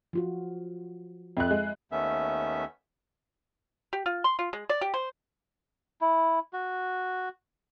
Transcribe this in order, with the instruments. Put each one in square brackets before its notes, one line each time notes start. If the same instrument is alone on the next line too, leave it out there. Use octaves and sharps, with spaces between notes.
[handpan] F3 F4 F#4
[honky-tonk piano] F2 F#6 [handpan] E5
[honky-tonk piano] G#3
[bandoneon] D#2 A3 B3 C#4 E5
[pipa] G4
F4
C6
F4
G#3
D5
G4
C5
[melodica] E4
F#4